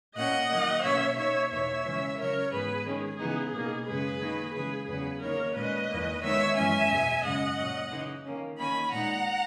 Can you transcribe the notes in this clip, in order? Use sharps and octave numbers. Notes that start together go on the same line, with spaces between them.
A#2 A#3 C#4 D#5 F#5
D#3 F#3 A#3
B2 A#3 C#4 C#5 E5
B2 A#3 D#4 C#5 E5
E2 B2 A#3 D#4 C#5 E5
C#3 E3 G#3 C#4
C#3 F#3 C#4 A#4 C#5
G#2 E3 B3 G#4 B4
D#3 G#3 C#4 G#4
C#3 E3 B3 D#4
B2 A#3 D#4
F#2 C#3 G#3 G#4 B4
D#3 A#3 D#4
C#3 E3 G#3 G#4 B4
E2 C#3 F#3 B3 G#4 B4
D#3 A#3 D#4 A#4 C#5
A#2 G#3 C#4 B4 D#5
E2 D#3 A#3
D#3 G#3 B3 D#4 C#5 E5
F#2 E3 G#3 C#4 E5 G#5
E2 B2 G#3
F#2 C#3 G#3 D#5 F#5
A#2 F#3 C#4
C#3 E3 G#3 D#4
D#3 A#3 C#4
D#3 A#3 C#4 G#5 B5
A#2 G#3 D#4 F#5 A#5